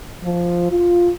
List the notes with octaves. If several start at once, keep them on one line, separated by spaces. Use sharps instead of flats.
F3
F4